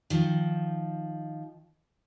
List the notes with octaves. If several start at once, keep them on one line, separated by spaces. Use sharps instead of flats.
D#3 F3